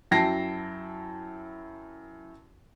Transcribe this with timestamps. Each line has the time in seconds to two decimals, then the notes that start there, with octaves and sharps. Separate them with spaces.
0.11 F#2 E4 G5 A5 A#6 C7